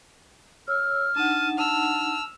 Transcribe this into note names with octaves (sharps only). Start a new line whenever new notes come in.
C#5 E6 F6
D4 D#4 F#5 A5 D#7
A5 E6 F6